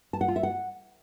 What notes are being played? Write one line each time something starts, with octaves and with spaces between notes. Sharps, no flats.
A5
F#5
F4
E5
F#5